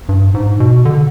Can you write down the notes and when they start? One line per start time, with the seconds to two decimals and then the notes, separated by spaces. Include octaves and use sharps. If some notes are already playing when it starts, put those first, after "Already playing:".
0.09 G2
0.34 G#2
0.60 B2
0.85 D3